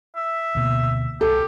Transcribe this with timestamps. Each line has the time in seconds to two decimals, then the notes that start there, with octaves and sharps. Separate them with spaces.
0.16 E5
0.55 D2 B2 A#3
1.21 C2 G4 A4